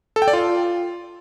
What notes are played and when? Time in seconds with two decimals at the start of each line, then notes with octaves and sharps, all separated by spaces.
0.16 A4
0.22 G5
0.28 D5
0.33 F4